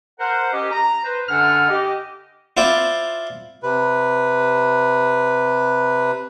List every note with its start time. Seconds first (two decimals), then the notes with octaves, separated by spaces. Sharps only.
0.18 A#4 C5 F#5
0.52 C#4 G4 D#5
0.71 A#5
1.04 B4 C5
1.29 F#2 D3 D4 F#5 G#5 F6
1.68 G4 D#5
2.57 E4 F4 C5 D5
3.63 C3 B4